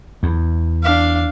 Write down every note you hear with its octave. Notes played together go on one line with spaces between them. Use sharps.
E2
D4 F5